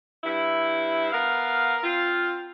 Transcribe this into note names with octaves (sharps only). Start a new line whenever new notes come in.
G2 E4
B3 A#4 F5
C4 F4